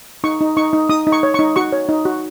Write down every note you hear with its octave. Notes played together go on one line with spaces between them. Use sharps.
D#4 C#6
D#4
D#4 C#6
D#4
D#4 D#6
D#4
C#6
C#5
C#6
D#4
F#4 C#6
C#5
D#4
F#4